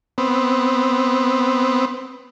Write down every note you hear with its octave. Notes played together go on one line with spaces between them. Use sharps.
B3 C4